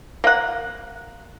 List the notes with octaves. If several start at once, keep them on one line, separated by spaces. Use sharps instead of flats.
A#3 F#5